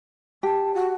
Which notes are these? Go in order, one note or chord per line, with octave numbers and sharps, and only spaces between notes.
G4 A5
F#4